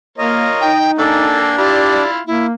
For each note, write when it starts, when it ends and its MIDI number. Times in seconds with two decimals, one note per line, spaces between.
0.18 0.48 58
0.18 0.69 65
0.18 0.69 70
0.18 0.69 73
0.18 0.78 75
0.61 1.39 63
0.61 0.91 79
0.98 1.53 58
0.98 2.03 62
0.98 1.50 69
0.98 1.53 79
0.98 1.53 80
1.58 2.20 64
1.58 2.20 65
1.58 2.04 67
1.58 2.10 74
1.58 2.20 83
2.27 2.53 58
2.27 2.46 64